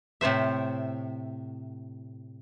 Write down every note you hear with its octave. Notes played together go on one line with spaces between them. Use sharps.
A2 C3 C5 E5